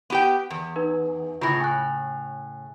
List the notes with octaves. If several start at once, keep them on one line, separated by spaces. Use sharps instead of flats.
B3 G4 G5
E2
D#4 B4
A2 C#3 F4 B5 A#6
G#5 F#6